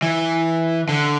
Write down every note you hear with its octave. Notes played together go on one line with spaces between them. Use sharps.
E3
D3